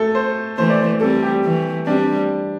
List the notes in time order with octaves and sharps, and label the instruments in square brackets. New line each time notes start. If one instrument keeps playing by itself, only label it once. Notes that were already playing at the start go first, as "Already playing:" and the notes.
Already playing: [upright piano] A3 A4
C5
[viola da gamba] E3 A3 [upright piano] C5
[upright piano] D5
C5
[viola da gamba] G3 C4 [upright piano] A4
[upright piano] G4
[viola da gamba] E3 A3
[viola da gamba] G3 C4 [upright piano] D4